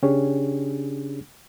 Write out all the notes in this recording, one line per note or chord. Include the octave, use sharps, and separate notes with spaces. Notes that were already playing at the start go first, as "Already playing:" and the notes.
C#3 C#4 D4 G4 G#4 C#5